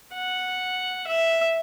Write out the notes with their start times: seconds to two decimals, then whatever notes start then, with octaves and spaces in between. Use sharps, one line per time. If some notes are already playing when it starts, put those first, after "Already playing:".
0.14 F#5
1.07 E5